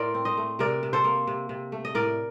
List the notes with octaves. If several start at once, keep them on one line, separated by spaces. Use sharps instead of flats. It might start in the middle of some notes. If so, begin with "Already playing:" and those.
Already playing: A2 A#4 C5 D5
C4
C5 D#5
A3
C3 A#4 D5
C3
A4 C5
A#3
C3
C3
A3
D#5
A2 A#4 D5